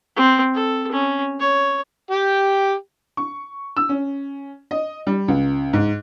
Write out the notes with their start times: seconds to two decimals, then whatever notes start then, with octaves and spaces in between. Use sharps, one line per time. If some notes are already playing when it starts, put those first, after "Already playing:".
0.16 C4
0.54 A4
0.92 C#4
1.40 C#5
2.11 G4 G5
3.17 C#6
3.77 E6
3.89 C#4
4.71 D#5
5.07 G3
5.28 C#2
5.73 G#2